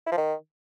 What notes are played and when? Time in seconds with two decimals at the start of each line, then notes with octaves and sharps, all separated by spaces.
0.06 E4
0.12 F3
0.17 D#3